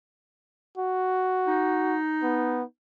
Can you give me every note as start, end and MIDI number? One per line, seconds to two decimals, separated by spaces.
0.77 1.98 66
1.47 2.64 63
2.23 2.63 59